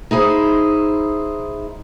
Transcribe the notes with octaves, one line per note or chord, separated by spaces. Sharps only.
D#4 E4 G#4 C5